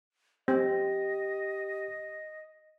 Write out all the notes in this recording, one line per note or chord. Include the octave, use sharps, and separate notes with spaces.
C4 G4 D#5